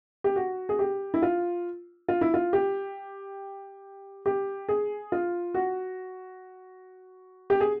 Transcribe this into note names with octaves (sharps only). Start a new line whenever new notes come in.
G4
F#4
G#4
G4
E4
F4
F4
E4
F4
G4
G4
G#4
F4
F#4
G4
G#4